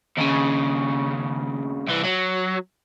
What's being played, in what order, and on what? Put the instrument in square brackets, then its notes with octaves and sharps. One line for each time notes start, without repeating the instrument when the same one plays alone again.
[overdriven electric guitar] D#2 C#3
C2 E3
F#3